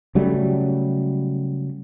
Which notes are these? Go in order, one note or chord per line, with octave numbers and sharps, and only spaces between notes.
C#3 F#3 G3 A3